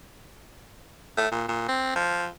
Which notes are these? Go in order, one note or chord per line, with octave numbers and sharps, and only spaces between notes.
A3
A#2
A#2
C4
F3